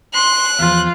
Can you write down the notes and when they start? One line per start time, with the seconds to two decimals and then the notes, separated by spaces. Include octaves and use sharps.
0.14 C6 F#6
0.59 E2 F3 F4